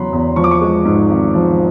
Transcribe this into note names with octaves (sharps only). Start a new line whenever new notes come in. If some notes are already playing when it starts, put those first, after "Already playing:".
Already playing: E2 C#3 F#3 B5 C6
E2
F3 C#6
D6
C#6
G#3
G#2
G#1
F3